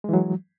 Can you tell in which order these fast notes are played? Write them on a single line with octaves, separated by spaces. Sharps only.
G#3 E3 F#3